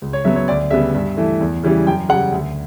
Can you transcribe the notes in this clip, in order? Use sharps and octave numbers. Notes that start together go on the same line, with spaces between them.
C#2
C#5
C#3 F#3 B3 E5
C#5
D2 D5
C#3 G3 B3 E5
G2
E3 A3
E2
C#3 E3 G3
F#2 G5
C#3 G3 F#5
D2